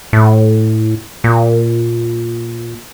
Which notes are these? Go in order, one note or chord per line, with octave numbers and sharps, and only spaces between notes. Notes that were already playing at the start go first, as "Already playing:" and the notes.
A2
A#2